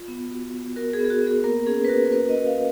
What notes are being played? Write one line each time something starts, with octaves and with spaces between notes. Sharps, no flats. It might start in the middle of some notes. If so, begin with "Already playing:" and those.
Already playing: F4
B3
F#4
B3
F#4 A#4
G#4
B3
G#4
F#4
B3
G#4
A#3 A#4
C#4 G#4
B4
F#4 A#4
A#4
A#3 B4
D#5
A#3
F5